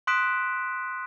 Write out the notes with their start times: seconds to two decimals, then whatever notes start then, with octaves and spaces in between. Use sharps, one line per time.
0.07 C6 D#6 F#6 B6 D7 E7